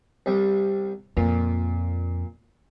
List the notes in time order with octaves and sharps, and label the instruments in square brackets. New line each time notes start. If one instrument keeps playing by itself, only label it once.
[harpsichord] C2 G3
[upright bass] F2 [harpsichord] A#2